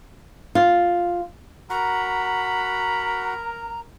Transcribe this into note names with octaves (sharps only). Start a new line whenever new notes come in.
F4
F#4 A#4 F#5 A#5 B5